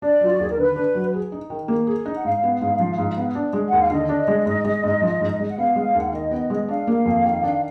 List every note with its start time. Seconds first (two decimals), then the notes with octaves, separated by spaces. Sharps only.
0.02 D4 D5
0.21 F#3 F4
0.31 F#4
0.40 D#2 G#4
0.49 A#4
0.57 D3 B4
0.76 D4
0.95 F#3
1.14 G#4
1.32 D#4
1.50 D#3
1.68 A#3
1.87 G#4
2.06 D#4
2.16 F#5
2.24 G#2 F5
2.43 B3
2.61 G#2
2.79 F3
2.98 G#2
3.17 B3
3.35 D4
3.53 G#3
3.66 F#5
3.72 D#2
3.79 F5
3.91 D3 D#5
4.09 D4
4.28 G#3
4.46 G#2
4.64 G#3
4.84 G#2
5.02 F3
5.21 G#2
5.39 G#3
5.48 F#5
5.57 B3 F5
5.76 G#3
5.95 D#2 F#5
6.05 F5
6.12 D#3 D#5
6.31 B3
6.50 G#3
6.68 D4 F5
6.87 A#3
7.05 F2
7.24 D#3
7.43 D4